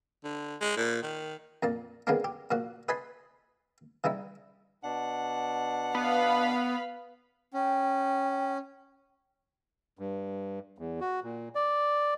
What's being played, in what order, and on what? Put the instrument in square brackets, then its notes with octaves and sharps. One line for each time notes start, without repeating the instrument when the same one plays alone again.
[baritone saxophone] D3
G#3
A#2
D#3
[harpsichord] F2 A#2 A5
D#3 F3 G#3 B3 C4 D4
G4
A#2 F3 F#4
B4 D#5 G#5 A5 B5 C6
E3 G3 D#4 E4
[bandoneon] B2 D4 [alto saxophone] F#5
[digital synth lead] B3 [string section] B4 F5 B5
[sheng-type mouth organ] C#4 [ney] G5
[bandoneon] G2
E2
F#4
A#2
D5